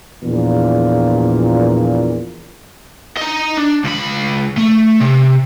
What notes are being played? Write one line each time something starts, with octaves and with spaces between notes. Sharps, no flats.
A#1 E2 A#2
D#5 A#5
D4
C#2 B5
A3
C3